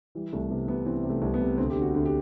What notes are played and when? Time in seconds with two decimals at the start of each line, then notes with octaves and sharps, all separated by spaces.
0.15 E3 G3
0.33 C2 A3
0.50 C3 B3
0.68 C3 B3
0.86 E3 C4
1.04 C3
1.10 A3
1.22 C2
1.34 B3
1.41 C3
1.58 D2 C4
1.70 G4
1.76 D3
1.82 F#4
1.94 D2
2.05 G4